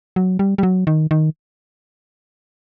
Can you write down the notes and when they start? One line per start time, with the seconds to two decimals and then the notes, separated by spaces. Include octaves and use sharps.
0.16 F#3
0.39 G3
0.58 G3
0.63 F#3
0.87 D#3
1.11 D#3